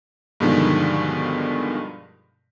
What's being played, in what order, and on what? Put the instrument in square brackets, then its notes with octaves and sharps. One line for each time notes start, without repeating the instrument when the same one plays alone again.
[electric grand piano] G2 B2 D3 D#3 F3 G#3